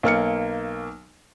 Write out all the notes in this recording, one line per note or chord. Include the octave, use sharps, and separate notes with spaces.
B1 A#3 F6 C#7